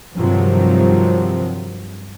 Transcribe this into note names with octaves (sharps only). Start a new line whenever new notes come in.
G2 C3 D#3 F3 F#3